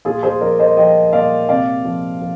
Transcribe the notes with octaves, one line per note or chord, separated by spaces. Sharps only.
A#2 F4 G#4
G#4 C5
F3 A#4 D5
C5 D#5
F3 D#5 G5
A#2 D5 F5
C3 D5 F5
F3
F3